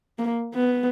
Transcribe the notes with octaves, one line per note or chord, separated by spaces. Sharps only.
A#3
B3